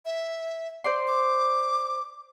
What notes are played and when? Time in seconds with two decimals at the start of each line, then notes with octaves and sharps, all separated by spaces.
0.05 E5
0.84 C5 D5 C6
1.07 D6